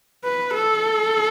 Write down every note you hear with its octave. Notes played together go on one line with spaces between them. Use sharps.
B4
A4